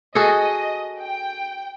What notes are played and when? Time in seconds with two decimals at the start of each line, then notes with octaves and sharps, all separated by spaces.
0.15 F#4 G#4 A4 D#5
1.01 G5